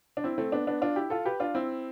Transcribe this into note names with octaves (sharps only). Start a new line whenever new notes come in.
D4
C4 E4
A3 C4
B3 D4
B3 D4
D4 F4
E4 G4
F4 A4
G4 B4
D4 F4
C4 E4